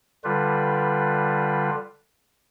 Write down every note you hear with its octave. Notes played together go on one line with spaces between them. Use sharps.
D3 G3 F4 B4